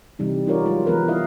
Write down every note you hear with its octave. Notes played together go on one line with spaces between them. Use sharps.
C3 E3 G3 D#4
D#4 F4 F#4 A#4 C#5 D5
F#3 G#3 F4 A#4
E3 F3 G3 B3 A#4 B4
E4 D#5 F5